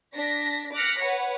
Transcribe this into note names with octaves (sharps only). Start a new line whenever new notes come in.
D4 A#6 B6
D6 F6 F#6 A#6 B6 C#7
B4 C#5 F#5